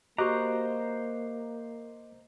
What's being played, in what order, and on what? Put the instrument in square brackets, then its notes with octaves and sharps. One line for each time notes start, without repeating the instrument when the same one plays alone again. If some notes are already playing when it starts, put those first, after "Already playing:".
[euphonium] A#3 [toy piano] F#4 G4 [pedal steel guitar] C5 A#5 [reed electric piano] D#5 D6 F#6